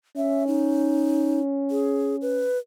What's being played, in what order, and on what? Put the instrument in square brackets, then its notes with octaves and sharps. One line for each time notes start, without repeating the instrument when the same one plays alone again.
[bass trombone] C#4 [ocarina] E5
[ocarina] D#4
G#4
B4